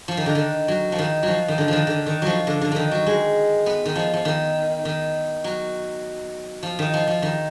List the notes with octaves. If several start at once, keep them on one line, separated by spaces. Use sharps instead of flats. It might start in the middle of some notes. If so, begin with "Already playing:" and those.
F3
D#3
D3
D#3
F#3
F3
D#3
F#3
F3
D#3
D3
D#3 F3
D3
D#3
F3 F#3
D3
D3
D3 D#3
F#3
G#3
B3
D#3
F3
F3
D#3
D#3
F#3
F3
D#3
F3
F3
D#3